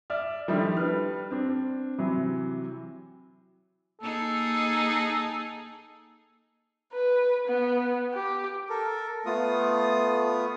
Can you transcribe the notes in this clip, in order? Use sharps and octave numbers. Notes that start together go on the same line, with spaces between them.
D5 E5 F6
D#3 F3 G3 A3 D4 E4
G3 D4 B4 F6
C4 D4
C3 E3 F#3
A#3 D#4 G#4 A4
B4
B3
G4
A4 A#4
A3 B3 F4 D#6